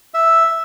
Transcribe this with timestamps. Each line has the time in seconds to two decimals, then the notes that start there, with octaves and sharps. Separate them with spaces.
0.14 E5